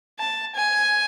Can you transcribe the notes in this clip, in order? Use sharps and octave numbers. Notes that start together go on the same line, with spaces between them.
A5
G#5